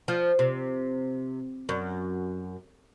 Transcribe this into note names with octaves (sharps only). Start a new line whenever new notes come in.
F3
C3
F#2